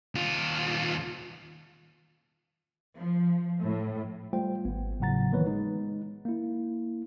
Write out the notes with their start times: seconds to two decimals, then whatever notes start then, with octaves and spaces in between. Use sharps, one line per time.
0.15 D#2 F4
2.97 F3
3.61 A2
4.33 G3 A3 F4 C5 G5
4.65 G#1 B3
5.00 A2 C#3 F#3 F#5 A#5 A6
5.32 D#3 E3 A#3 B3 B4 C#5
5.46 G#3 D#4
6.25 A#3 E4